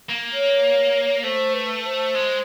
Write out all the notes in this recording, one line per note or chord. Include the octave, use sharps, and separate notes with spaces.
A#3
C#5
A3 C5
B4
C5
G#3